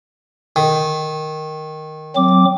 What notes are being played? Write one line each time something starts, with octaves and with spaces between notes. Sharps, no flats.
D#3
F#3 C4 D6